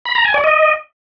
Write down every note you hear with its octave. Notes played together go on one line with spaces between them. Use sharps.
B5
A#5
G#5
D5
D#5